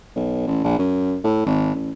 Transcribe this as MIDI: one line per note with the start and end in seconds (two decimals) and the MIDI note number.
0.16 0.45 35
0.47 0.61 33
0.64 0.76 34
0.79 1.18 42
1.24 1.42 45
1.46 1.71 32
1.74 1.91 33